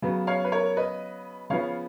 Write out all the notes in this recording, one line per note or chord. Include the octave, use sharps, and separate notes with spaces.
C#3 F#3 B3
C#5 F5
B4
A#4 C#5
B4 D#5
C#3 F3 B3 C#5 F5